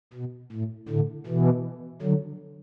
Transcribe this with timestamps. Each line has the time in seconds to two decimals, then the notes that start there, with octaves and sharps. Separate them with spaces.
0.13 B2
0.52 A2
0.89 A2 D3
1.27 B2 E3
2.02 D3 F#3